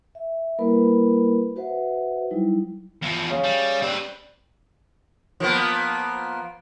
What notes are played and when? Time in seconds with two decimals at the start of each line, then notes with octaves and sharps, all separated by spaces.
0.15 E5
0.59 G3 A#3 E4 A#4 B4 B5
1.56 F#4 B4 C5 E5 F#5
2.30 F#3 G3 D#4 E4
3.02 E2 F3
3.30 C#3
3.44 G3
3.82 G3 C4 B4
5.40 F3 A#3 B3